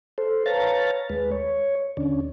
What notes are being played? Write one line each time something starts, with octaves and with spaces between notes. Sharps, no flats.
A4 C5
B4 C#5 F5 A5 A#5 A6
D#2 G#3 B4
C#5
D#2 D3 C#4 D4